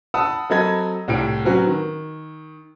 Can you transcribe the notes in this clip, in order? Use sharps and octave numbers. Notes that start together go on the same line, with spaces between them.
F#5 A5 B5 D#6 E6
F#3 C4 A4 D#5 B5 G#6
C2 A2 D7
F#3 C4 C#4 F#4 B4
D#3